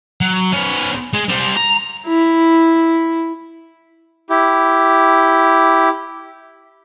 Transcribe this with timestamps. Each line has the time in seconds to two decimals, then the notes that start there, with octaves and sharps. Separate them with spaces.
0.21 F#3
0.53 B3 C#4
1.13 G#3
1.29 G3 C5
1.57 A#5
2.07 E4
4.30 E4 G4